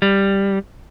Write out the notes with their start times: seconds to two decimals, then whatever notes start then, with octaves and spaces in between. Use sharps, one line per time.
0.02 G3